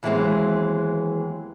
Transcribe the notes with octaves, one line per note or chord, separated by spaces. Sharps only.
D#2 E3 F#3 G#3 B3 C4